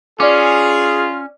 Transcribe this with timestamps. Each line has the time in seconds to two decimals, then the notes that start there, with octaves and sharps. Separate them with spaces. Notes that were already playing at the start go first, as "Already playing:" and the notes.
0.20 C#4 F4 G#4 D5 D6